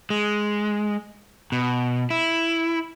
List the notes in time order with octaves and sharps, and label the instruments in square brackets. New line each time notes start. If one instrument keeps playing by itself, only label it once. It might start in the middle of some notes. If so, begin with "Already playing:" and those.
[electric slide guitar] G#3
B2
E4